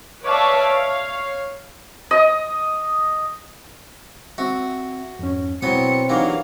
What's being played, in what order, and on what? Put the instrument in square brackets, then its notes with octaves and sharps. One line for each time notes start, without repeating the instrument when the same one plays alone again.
[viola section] B4 C#5 D5 E5 F5 A5
C#5 F5
[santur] D#5
[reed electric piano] C4 E5 [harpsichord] F#4
[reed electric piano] F2 G#2 C#4
[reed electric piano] B2 E4 [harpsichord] F#3 B3 D#6 [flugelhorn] C4 [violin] C#7
[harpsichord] E3 F#3 A#3 [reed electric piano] D4 D#4 G4 [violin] F5